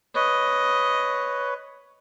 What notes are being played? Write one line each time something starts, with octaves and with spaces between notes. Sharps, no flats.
B4 C#5 D#5